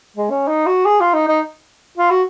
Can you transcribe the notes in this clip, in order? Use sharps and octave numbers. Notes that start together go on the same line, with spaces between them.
G#3
C#4
D#4
F#4
G#4
F4
D#4
D#4
F4
F#4